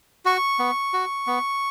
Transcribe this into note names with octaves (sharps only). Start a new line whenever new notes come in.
F#4 C#6
B3
F#4
B3